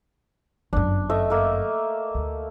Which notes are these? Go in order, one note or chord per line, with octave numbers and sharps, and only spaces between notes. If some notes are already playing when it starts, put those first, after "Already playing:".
G1 F#2 D4
A3 D#5 E5
A3 A#3
D2